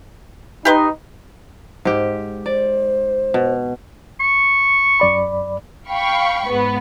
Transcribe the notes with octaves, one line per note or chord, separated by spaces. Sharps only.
D#4 G4 B4 C6
G#2 G4
C5 D5
B2
C#6
F#2 D5 B5
F5 G5 B5 C#6
G#2 B3